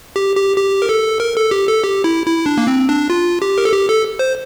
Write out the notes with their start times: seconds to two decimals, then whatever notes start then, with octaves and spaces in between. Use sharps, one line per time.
0.16 G4
0.37 G4
0.57 G4
0.82 A#4
0.89 A4
1.20 A#4
1.37 A4
1.51 G4
1.68 A4
1.84 G4
2.04 E4
2.26 E4
2.46 D4
2.58 A#3
2.67 C4
2.89 D4
3.10 F4
3.42 G4
3.58 A#4
3.65 A4
3.72 G4
3.89 A4
4.19 C5